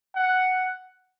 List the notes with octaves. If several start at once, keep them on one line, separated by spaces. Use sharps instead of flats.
F#5